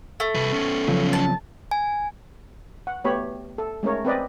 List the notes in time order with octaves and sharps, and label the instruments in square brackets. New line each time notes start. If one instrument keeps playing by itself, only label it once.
[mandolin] A3
[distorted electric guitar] C2 B4
B3 C#4
[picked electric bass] C#3 F3 F#3
[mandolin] A5
[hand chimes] G#5
[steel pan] F#5
A3 B3 G4 C#5 B5
A4
G#3 A3 C#4 A#4 C#5
C4 B4 D5 D#5